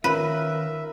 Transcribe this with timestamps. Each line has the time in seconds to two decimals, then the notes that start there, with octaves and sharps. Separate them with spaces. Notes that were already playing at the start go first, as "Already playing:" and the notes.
0.04 D#3 C#4 F4 A#4 B4 E5